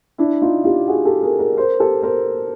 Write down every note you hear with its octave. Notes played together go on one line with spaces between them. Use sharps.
D4 E4
D#4 F4
F4 G4
F#4 G#4
G4 A4
G#4 A#4
G#4 A#4
A#4 C5
G4 A4
A#4 C5